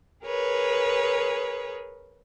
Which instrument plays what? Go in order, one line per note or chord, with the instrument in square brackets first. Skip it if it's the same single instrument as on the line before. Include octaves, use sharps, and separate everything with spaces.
[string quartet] G#4 A#4 B4 C#5